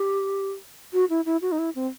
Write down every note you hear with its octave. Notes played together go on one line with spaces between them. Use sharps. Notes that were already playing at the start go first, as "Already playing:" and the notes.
Already playing: G4
F#4
E4
E4
F#4
D#4
E4
C4